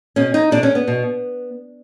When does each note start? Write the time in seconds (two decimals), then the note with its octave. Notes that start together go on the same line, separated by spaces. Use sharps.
0.16 B2 C#4
0.34 D#4
0.51 B2 D4
0.63 C#4
0.75 B3
0.88 B2